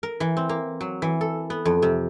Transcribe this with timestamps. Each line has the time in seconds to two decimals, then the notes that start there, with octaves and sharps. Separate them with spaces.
0.03 A#4
0.20 E3
0.37 C4
0.49 A#3
0.81 F#3
1.02 E3
1.21 A4
1.50 B3
1.65 F2
1.82 C3